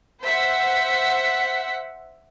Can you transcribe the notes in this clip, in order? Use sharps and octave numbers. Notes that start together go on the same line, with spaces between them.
C5 E5 F#5 B6